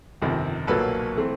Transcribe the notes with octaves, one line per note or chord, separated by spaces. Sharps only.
G1 F2 C3 D#3
B1 A#2 F#3 A#3 A4 B4
E3 A3 C4